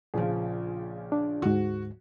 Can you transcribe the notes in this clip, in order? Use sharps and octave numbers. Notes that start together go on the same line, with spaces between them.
A#1 C#3 F3
D4
D2 G#2 F#4